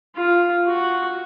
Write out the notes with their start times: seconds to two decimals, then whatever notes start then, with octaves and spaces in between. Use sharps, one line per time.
0.16 F4
0.68 F#4